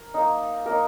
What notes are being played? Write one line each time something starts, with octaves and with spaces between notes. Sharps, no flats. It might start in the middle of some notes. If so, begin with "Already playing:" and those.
Already playing: A#4
A#3 D#4
A#3 D#4 A#4